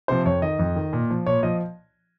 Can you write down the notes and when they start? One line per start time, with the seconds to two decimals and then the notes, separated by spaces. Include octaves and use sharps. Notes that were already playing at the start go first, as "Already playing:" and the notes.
0.08 C3 F3 C5
0.26 F2 C#5
0.42 D#3 D#5
0.59 F2
0.76 D#3
0.93 A#2
1.10 F3
1.26 A#2 C#5
1.43 F3 D#5